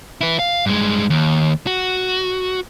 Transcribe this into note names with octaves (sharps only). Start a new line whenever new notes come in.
E4 B4
F5
G2 G#3
D#2
F#4